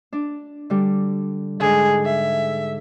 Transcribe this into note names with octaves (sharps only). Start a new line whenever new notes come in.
D4
D3 G3
G#2 D3 G#4
E5